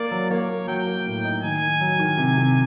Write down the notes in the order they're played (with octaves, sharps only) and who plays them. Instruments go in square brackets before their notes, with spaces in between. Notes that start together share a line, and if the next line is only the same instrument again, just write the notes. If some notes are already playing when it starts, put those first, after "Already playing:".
Already playing: [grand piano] A#3 [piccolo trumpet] D5
[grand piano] F#3
[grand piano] A#3 [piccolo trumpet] C#5
[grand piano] A#3
[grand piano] F#3 [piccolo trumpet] G5
[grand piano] A#3
A2
D#4
[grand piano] D#3 [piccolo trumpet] G#5
[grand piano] D#3
F#3
D#3
C3
C3